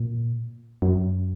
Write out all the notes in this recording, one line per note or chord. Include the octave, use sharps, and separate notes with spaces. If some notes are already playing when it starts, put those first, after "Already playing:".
Already playing: A#2
F#2